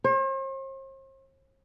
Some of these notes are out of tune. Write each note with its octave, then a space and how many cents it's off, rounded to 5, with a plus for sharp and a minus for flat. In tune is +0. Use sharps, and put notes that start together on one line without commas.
C5 +45